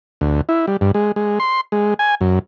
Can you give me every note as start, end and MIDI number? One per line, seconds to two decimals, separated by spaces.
0.21 0.41 38
0.49 0.66 64
0.67 0.77 55
0.81 0.92 43
0.94 1.12 56
1.16 1.39 56
1.40 1.61 84
1.72 1.94 56
1.99 2.15 80
2.21 2.39 42